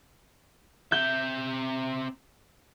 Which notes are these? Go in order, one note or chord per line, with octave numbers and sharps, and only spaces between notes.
C4 E5 G6